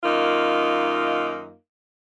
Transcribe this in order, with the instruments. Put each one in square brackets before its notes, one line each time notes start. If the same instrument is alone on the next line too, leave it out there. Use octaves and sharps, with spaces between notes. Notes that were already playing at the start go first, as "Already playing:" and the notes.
[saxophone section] F#2 D#3 A#3 D#4 F4